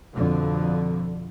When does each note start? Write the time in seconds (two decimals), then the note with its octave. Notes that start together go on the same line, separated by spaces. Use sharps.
0.13 F2 B2 D3 F3